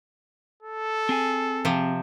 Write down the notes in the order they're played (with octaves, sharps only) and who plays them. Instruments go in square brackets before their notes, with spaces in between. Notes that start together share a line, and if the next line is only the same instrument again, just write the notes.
[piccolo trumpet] A4
[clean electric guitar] C4 G#4 G#5
[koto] C3 F3